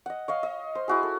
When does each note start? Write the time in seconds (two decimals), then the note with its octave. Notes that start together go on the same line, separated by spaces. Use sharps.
0.06 D#5 F#5
0.28 C#5 D#5 F5
0.43 D#5
0.75 C5
0.88 E4 F#4 G#4
1.03 A4